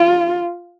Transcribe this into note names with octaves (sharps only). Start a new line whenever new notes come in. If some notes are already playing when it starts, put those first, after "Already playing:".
Already playing: F4